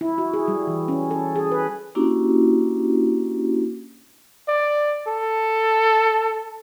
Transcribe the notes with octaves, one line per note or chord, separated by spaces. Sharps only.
E4
F#4
G#4
G3
E3
C#4
A4
G#4
B4
A#3 C#4 D4 E4 F#4 G4
D5
A4